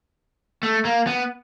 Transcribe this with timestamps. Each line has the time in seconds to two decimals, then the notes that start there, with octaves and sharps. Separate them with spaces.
0.63 A3
0.85 A#3
1.07 B3